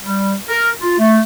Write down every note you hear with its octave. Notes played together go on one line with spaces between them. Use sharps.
G3
A#4
F4
A3